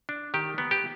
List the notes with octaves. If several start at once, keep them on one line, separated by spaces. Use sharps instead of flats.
D4
D#3 G4
B3
G4